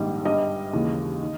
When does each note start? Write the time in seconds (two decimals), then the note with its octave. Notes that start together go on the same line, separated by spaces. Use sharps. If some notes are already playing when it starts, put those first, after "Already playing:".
Already playing: A#1 G#2 D#3 G3 D#5
0.25 G1 G2 G3 D#5
0.73 D#2 C#3 E3 G#3
1.22 D#3